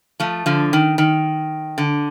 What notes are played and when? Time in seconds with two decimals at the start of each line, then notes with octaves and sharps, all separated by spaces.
0.20 F3 A3
0.46 D3 F3
0.73 D#3
0.98 D#3
1.78 D3